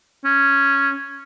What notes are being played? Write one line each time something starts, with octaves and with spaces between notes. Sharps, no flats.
C#4